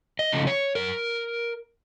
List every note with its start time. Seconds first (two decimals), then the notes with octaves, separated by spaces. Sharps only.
0.19 D#5
0.32 C#3 F3 A3
0.47 C#5
0.75 F#2 A#4